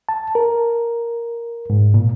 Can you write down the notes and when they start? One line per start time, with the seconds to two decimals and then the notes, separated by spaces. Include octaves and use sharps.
0.09 A5
0.35 A#4
1.70 G#2
1.94 A#2